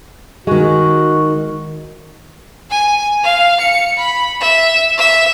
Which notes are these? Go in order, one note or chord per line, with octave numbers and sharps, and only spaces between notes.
D#3 G#3 F#4
G#5
F5
C#7
B5
E5
E5